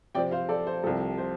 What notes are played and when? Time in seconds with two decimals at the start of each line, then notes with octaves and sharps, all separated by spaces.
0.15 C3 F3 C4 D5 G5
0.31 C5 F5
0.49 A4 D5
0.67 C5
0.84 C2 C3 F3 A4
1.18 C5